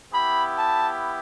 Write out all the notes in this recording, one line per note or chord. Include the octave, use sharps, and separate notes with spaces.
B3 E4 G4 B5
A5